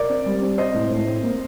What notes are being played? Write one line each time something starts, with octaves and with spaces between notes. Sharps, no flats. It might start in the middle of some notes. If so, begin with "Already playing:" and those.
Already playing: A#4 D5
C4
G3
C4
C4 C5 D#5
A2
A2
C4
A#3